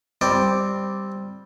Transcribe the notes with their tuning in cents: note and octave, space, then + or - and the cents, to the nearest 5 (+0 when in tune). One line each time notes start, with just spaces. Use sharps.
G3 +0 C4 +0 D5 +0